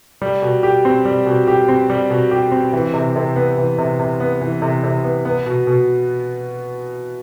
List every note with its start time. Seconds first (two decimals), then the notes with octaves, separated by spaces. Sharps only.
0.22 G3
0.42 B2
0.63 G4
0.85 C4
1.05 G3
1.26 B2
1.48 G4
1.69 C4
1.90 G3
2.10 B2
2.31 G4
2.52 C4
2.73 E3
2.94 C3
3.16 C3
3.36 B3
3.57 E3
3.78 C3
4.00 C3
4.20 B3
4.41 E3
4.62 C3
4.84 C3
5.04 B3
5.25 B3
5.46 B2
5.67 B2